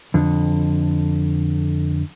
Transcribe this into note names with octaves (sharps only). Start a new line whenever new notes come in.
F2 D3